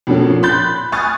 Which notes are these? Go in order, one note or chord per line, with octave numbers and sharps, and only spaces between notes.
F2 B2 D3 A#3 C#4
A#2
B5 C6 F#6 G6 A6
G#5 C#6 D#6 F6 F#6 A6